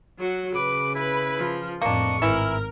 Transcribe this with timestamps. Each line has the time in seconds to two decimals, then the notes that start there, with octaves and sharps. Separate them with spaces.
0.19 F#3 F#4
0.55 C#3 B4 D6
0.95 E4 B4
1.38 F3
1.82 F2 A2 A#3 D4 D#5 C#6
2.22 G#1 E3 E4 A#4